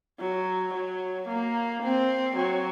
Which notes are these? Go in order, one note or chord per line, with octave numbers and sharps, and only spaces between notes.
F#3
F#3
A#3
C4
F#3